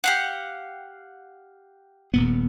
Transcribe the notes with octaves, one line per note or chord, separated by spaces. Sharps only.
G4 F5 F#5
D#1 A#2 B3